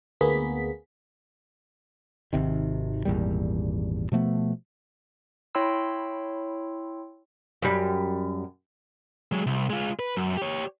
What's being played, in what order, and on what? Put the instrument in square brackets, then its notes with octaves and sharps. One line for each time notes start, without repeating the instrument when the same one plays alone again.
[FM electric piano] D2 A#3 B3 G#4 B6
[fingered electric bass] G#1 C3 D#3
G#1 E2 A#2 G3
B2 F3 A3 B3
[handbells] E4 C#5 G5 B5 C6 E6
[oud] F#2 G3
[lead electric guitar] F#3 G#3
C2
G#3 F4
B4
F#2
G4 C#5